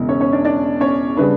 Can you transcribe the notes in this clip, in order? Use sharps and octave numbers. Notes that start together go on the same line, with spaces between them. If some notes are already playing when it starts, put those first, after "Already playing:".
Already playing: E1 E2 C#3 E3
C#4 C#5
C#4 C#5
D4 D5
D4 D5
C#4 C#5
C#3 G3 D4 B4